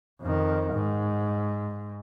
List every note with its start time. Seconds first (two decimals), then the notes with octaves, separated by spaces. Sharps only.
0.21 F2 D#3
0.73 G#2